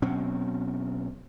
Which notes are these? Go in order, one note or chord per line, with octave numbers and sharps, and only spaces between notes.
B2 F#3 C4 C#4